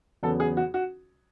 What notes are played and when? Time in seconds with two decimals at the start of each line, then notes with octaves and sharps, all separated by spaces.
0.23 E2 C#3 F#3 B3 A4
0.40 G#4
0.57 F#4
0.74 F#4